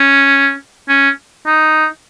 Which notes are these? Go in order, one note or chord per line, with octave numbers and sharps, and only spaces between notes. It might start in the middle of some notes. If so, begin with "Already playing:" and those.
Already playing: C#4
C#4
D#4